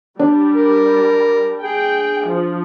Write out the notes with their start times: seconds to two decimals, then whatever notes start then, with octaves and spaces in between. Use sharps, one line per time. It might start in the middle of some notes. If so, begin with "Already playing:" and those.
0.19 G3 D4
0.55 A#4
1.63 G#4 G5
2.25 F3